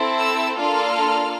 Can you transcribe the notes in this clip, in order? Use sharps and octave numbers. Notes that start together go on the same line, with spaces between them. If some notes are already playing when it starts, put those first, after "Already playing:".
Already playing: C4 E4 A4
E6
A#3 D4 F4 A4 F6